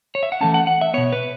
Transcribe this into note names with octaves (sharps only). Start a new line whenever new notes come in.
C#5
E5
F#5
E3 A3 C#4 A5
F#5
F#5
E5
B2 B3 C#5
B4